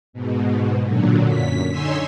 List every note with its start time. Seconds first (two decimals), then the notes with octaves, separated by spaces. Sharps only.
0.13 G#2 B2
0.83 A#2 D3 F#3
1.27 F#2 B6
1.69 D3 D#4 C#5 G#5 C6 E6